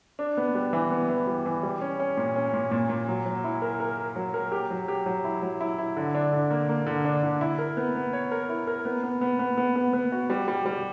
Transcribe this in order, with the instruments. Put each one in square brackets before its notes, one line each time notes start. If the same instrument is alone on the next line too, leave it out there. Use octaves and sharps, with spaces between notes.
[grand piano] D4
B3
G3
E3
B3
E3
G3
E3
G3
C#4
C#4
A#2
C#4
A#2
A#2
A#2
F#3
F#3
E4
A#4
A#4
A#4
F#3
A#4
G4
F#3
G4
F#3
E4
F#3
E4
E4
D3
D4
D3
A#3
A#3
D3
D4
D3
E4
A#4
B3
B3
C#5
A#4
E4
A#4
B3
B3
B3
B3
B3
B3
B3
F#4
G3
G3
G3